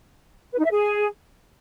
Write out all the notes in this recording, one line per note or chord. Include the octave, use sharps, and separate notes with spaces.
B4
D#4
E5
G#4